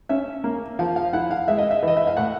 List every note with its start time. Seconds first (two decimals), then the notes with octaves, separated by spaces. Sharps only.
0.09 C#4 E5
0.44 A#3
0.79 F3 F5
0.96 F5
1.13 E4 F#5
1.31 F5
1.48 G#3 E5
1.58 D#5
1.71 E5
1.83 E3 D#5
1.97 E5
2.07 F5
2.17 A2 F#5